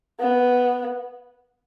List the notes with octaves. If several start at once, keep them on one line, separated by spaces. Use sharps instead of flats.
B3